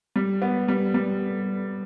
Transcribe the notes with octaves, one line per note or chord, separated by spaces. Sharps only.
G3
B3
G3
G3